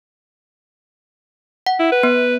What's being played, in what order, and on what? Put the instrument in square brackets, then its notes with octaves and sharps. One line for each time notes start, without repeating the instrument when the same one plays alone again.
[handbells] F#5
[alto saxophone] E4
B4
[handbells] B3